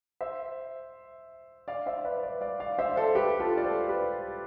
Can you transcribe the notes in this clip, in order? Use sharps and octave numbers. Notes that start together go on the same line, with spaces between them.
C5 E5
D5 F5
C5 E5
B4 D5
B4 D5
D5 F5
D5 F5
C5 E5
A4 C5
G4 B4
F4 A4
D5
A4 C5
G4 B4